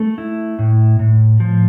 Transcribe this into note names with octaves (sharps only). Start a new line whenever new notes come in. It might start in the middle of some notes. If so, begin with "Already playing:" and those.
Already playing: A3 A4
E4
A2
A2
F3